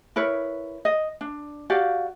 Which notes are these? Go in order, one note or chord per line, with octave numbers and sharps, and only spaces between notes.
E4 A#4 B4 C#5
D#5
D4
F#4 G4 D5 F5